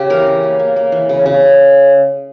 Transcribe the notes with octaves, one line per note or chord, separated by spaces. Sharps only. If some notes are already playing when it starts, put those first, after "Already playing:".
Already playing: C#3 G4
E3 A#4
C#3
A#3
A#3
A#3
E3
C#3
C#3